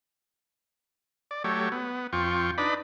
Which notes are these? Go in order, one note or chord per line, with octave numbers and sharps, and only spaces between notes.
D5
F#3 A3 G4 C#5
B3
F2 F4 G5 C#6
D4 D#4 B4 D5 B5